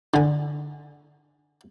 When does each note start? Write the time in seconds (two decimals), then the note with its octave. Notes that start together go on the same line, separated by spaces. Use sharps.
0.14 D3 G#5